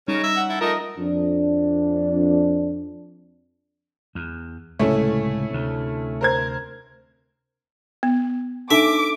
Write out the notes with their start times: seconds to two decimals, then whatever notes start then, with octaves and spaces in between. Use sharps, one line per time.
0.08 C#3 G3 C#4 D#4 A#4 C#5
0.23 E5
0.37 F#5
0.49 E4 A4
0.61 A3 F4 A#4 D#5
0.96 F2 D4
4.15 E2
4.79 C#2 A2 C3 A3 C#4 E4
5.50 D2 C3
6.21 A#4 C5 G#6
8.03 B3
8.71 D4 D#4 A4 E5 D6